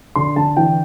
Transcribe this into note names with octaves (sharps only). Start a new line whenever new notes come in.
D3 C6
D3 A5
E3 G5